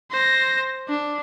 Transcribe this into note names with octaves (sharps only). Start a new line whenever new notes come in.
C5 A#6
D4